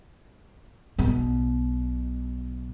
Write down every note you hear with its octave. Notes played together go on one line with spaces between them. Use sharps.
B1 B2